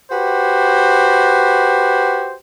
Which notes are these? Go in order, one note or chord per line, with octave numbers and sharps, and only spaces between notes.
F#4 G4 B4 C5